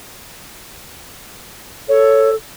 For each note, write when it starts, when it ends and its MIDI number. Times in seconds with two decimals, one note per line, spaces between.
1.89 2.35 69
1.89 2.30 73